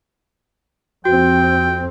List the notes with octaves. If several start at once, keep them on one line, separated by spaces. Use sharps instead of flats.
F2 C4 F#4 G5